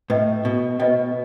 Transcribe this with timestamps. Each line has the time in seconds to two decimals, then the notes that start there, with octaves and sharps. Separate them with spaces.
0.10 A2 B4 D#5 G5
0.45 B2
0.79 B2 B4 D#5 G5